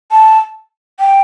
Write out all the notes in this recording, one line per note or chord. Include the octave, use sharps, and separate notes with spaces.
A5
G5